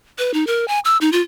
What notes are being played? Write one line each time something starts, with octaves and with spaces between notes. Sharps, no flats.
B4
D#4
A#4
G#5
E6
D#4
F4